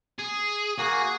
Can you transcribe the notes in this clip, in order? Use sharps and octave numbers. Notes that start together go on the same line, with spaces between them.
G#4
A#3 F#4 G#4 G#5